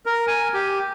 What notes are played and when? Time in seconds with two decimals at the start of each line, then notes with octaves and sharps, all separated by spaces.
0.06 A#4
0.27 G#5
0.54 G4